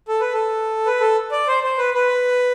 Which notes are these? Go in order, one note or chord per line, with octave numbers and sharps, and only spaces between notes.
A4
B4
A4
B4
A4
D5
C5
C5
B4
B4